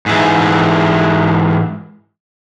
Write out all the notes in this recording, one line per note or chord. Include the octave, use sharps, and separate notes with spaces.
G#2 E3